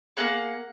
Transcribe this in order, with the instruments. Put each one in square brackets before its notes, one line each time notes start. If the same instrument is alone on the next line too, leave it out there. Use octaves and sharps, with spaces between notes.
[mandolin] A#3 D#4 G#4 F#5